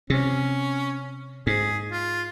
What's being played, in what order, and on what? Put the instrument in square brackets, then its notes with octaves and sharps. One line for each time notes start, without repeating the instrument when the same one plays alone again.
[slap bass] C3 [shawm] C#4
[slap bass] G#2 [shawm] G#4
[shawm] F4